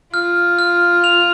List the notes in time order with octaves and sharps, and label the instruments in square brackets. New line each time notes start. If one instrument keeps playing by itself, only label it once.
[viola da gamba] F4 [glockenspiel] F6
[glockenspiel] F6
F7